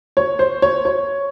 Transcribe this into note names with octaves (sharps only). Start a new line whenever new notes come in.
C#5
C5
C#5
C#5